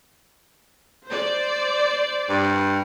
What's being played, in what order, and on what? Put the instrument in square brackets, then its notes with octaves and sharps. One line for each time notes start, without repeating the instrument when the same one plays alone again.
[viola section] C5 D5
[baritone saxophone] G2